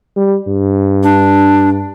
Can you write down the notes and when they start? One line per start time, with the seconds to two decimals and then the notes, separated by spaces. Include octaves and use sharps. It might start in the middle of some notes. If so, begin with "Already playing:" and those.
0.16 G3
0.48 G2
1.03 D4